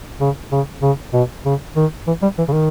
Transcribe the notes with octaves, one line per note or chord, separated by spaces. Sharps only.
C#3
C#3
C#3
B2
C#3
D#3
E3
G3
E3
C#3
D#3